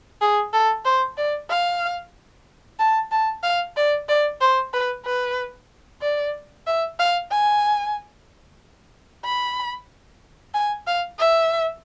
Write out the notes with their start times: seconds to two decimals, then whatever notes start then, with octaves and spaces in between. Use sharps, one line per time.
0.22 G#4
0.53 A4
0.85 C5
1.17 D5
1.50 F5
2.79 A5
3.12 A5
3.43 F5
3.77 D5
4.09 D5
4.41 C5
4.74 B4
5.06 B4
6.02 D5
6.67 E5
6.99 F5
7.31 G#5
9.25 B5
10.54 G#5
10.87 F5
11.19 E5